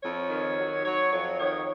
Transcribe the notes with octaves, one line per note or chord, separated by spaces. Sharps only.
F2 C#5
D#3
F#3
F#3 C#5
F2 C#5
D#3 C#5